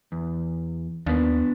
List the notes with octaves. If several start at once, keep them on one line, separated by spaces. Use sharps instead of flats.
E2
D#2 B3 D4